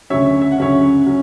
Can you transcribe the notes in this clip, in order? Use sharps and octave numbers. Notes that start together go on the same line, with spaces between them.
D2 C#3 F#3 C#4 C#5 E5
E5
F#5
D2 C#3 F#3 C#4 C#5 E5
F#3 C#4